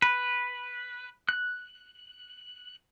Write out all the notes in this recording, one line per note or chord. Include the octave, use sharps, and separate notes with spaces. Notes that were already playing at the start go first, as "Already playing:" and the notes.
B4
F#6